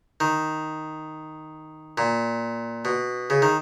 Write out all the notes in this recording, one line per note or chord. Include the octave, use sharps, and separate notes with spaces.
D#3
A#2
B2
C#3
D#3